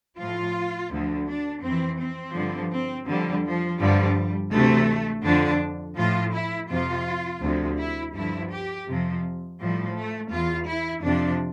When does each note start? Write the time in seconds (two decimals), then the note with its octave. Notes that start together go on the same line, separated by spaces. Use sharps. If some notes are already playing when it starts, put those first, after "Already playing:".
0.17 A2 F3 F4
0.90 D2 D3 F3
1.26 D4
1.62 F2 E3 C4
1.98 C4
2.35 G2 D3 F3
2.71 C4
3.07 F2 D3 F3 G3
3.43 F3
3.80 G2 D3 F3 G3
4.52 D2 C3 E3 A3
5.24 F2 D3 F3 D4
5.96 A2 F3 F4
6.33 E4
6.69 F2 C3 F3 F4
7.42 D2 C3 F3
7.77 E4
8.14 G2 D3 F3 E4
8.50 G4
8.87 F2 C3 F3
9.59 A2 F3 G3
9.94 A3
10.31 E2 E3 F4
10.67 E4
11.03 F2 C3 F3 D4